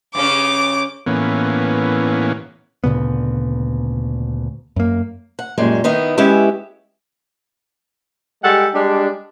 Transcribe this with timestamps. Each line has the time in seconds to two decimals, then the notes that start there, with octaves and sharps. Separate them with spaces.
0.15 G2 C#3 C#4 D6
1.06 A2 E3 A#3 B3 C#4
2.84 D2 A#2 C#3 B3
4.76 F#2 A#3
5.39 F#5
5.58 F#2 A#2 G3 G#3
5.84 D#3 B3 D#4 E4
6.17 G#3 B3 C#4 E4 G4 E5
8.43 G3 G#3 A4 F#5 G5
8.74 G3 G#3 D4